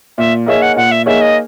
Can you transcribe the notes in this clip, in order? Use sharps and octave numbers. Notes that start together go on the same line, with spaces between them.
A#2 E5
A#3 D#4 G#4 C#5 E5
F#5
A#2 F#5
E5
A#3 D#4 G#4 C#5 E5
D#5